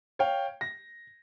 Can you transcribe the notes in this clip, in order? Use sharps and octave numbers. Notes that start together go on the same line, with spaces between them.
C#5 F5 G5
A#6